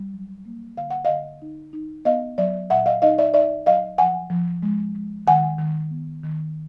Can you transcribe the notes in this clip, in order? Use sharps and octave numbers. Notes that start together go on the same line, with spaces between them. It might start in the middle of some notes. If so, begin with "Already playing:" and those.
Already playing: G3
F#3
A#3
D3 F5
F#5
D3 D#5 F5
D#4
D#4
B3 D#5 F5
F#3 D5 E5
A#2 E5 F#5
D#5 F5
D#4 D#5 F5
D5 E5
D#4 D5 E5
F#3 D#5 F5
F3 F#5 G#5
F3
G#3
G#3
D#3 F#5 G#5
D#3
B3
D#3